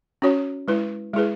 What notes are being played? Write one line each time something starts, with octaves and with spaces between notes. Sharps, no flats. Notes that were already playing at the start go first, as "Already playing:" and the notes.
C#4 F#4 C#5
G#3 E4 B4
G#3 E4 G#4 B4